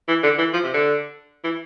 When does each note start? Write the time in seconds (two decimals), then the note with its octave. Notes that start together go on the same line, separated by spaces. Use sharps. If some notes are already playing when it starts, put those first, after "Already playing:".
0.08 E3
0.23 D3
0.38 E3
0.53 F3
0.64 C3
0.74 D3
1.44 E3